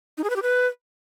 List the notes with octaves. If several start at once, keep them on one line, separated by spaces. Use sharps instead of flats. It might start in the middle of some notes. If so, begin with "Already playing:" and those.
D#4
G#4
B4
G4
B4